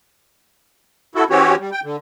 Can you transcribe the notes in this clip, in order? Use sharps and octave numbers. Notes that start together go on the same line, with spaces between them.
E4 F#4 A4
E3 C4 C#4 F#4 G4 C#5
G3
G5
D3